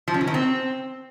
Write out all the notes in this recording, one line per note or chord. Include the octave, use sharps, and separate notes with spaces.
F3
C#4
E3
D#3
C4